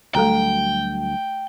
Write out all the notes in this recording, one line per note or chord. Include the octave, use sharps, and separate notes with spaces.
D2 F#3 G3 A3 A4 G5 A#5